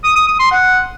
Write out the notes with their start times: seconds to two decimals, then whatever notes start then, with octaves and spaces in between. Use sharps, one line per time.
0.04 D#6
0.16 D#6
0.28 D#6
0.40 C6
0.52 F#5